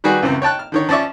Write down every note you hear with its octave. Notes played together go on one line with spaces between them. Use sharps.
D#3 G3 F#4 G#4 B4
C#2 F#2 E3 C4
C#5 G5 A5 F#6
F6
D3 D#3 C#5
F3 C#4 D5 E5 C#6